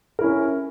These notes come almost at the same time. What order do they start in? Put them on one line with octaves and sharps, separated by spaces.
A#4 E4 C#4